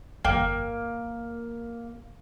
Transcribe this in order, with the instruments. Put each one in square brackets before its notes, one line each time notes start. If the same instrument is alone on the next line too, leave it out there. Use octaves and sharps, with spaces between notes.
[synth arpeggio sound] G1 F2 G5 [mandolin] A#3